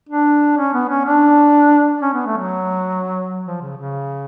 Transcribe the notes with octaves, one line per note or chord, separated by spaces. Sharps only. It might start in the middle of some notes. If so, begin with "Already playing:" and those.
D4
C#4
B3
C#4
D4
C#4
B3
A3
F#3
F3
C#3
C#3